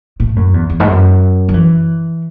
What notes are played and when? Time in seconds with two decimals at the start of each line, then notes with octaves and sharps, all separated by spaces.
0.20 A2
0.36 F#2
0.54 E2
0.70 E2
0.80 G#2
0.87 F#2
1.49 F#3
1.54 E3